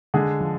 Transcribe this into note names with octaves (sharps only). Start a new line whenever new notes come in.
D3 G#3 G#4
F3